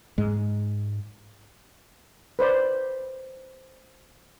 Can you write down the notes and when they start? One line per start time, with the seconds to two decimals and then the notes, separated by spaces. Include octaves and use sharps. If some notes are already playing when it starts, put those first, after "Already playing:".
0.18 G#2 G#3
2.39 B4 C5 D5